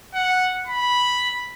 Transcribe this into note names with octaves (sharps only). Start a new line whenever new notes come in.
F#5
B5